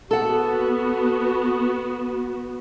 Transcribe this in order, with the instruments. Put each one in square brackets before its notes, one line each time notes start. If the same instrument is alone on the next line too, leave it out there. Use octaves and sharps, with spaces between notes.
[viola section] B3 F#4 [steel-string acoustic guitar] A4 F#5